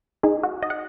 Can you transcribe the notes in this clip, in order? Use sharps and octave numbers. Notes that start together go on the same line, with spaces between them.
D#4 G#4
F#4
D#5
F#5